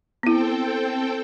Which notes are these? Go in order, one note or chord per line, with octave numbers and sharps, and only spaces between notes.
B3 C4 E4 A4 G5